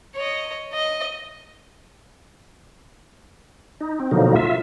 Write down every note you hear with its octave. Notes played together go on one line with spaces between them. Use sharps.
C#5 D#5
D#5
D#4
C4
B2 D3 F3 F#3 A#3 D#4
F4 E5